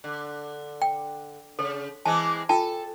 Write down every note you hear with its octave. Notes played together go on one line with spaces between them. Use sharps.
D3
G5
C#3 A4 C#5
E3 G#3 C4 G#5 A5
F4 A4 G5 A5